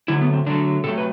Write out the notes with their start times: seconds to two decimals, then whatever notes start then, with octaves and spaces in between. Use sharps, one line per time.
0.08 D3 F#3 A3 E4
0.21 B3
0.33 C4
0.46 D3 F#3 A3 D4
0.84 C3 F#3 A3 A4
0.98 B4